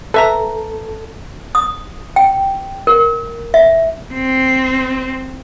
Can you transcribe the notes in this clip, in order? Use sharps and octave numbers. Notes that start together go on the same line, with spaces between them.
A4 B4 E5 A#5
D#6
G5
A#4
E5
C4